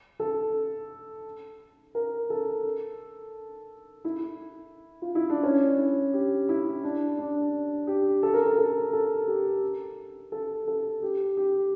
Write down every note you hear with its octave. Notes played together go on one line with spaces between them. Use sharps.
A4
A#4
A4
E4
F4
E4
D4
C#4
E4
G4
E4
D4
D4
G4
A4
A#4
A4
A4
A4
G4
A4
A4
G4
G4